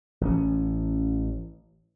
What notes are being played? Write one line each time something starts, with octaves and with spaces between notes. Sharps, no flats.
A1 E3 C#4